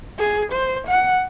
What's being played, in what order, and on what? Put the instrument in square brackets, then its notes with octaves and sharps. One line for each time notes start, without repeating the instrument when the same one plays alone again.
[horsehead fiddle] G#4
C5
F#5